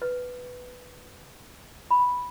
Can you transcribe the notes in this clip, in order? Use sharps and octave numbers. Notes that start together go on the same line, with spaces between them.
B4
B5